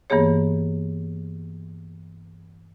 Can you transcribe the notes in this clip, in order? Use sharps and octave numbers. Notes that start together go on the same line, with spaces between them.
G2 E3 A#3 B3 G#4 C#5